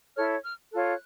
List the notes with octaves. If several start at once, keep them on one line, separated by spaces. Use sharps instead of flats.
E4 A4 C#5 F6
F6
F4 A4 C#5 F#6